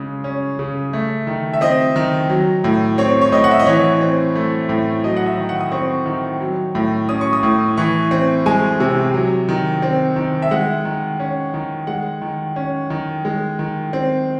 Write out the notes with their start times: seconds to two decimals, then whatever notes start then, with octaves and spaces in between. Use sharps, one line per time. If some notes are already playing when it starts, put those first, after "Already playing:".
Already playing: C#3 G#3
0.24 C#4
0.59 C#3
0.93 A3
1.27 D#3
1.54 E5
1.61 C4 D#5
1.96 D#3
2.29 F#3
2.64 A2
2.98 C4 C#5
3.21 C#5
3.32 A2 D#5
3.44 F#5
3.51 E5
3.59 D#5
3.66 E3 C#5
4.01 C4
4.35 A3
4.69 A2
5.04 F#3 D#5
5.17 F#5
5.26 E5
5.38 D#3
5.49 F#5
5.61 D#6
5.72 C4 C#6
6.06 D#3
6.40 F#3
6.75 A2
7.09 C#4 D#6
7.21 C#6
7.33 D#6
7.43 A2
7.77 E3 C#6
8.11 C4
8.46 G#3 G#5
8.80 C3
9.14 F#3
9.49 D#3
9.82 C4
10.16 D#3
10.42 E5
10.51 G#3 F#5
10.85 D#3
11.20 C#4
11.54 D#3
11.87 G#3 F#5
12.22 D#3
12.56 C#4
12.90 D#3
13.25 G#3
13.59 D#3
13.93 C4